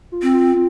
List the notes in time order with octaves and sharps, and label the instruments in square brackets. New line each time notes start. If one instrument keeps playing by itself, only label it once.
[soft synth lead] F4
[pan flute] C4
[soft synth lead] F4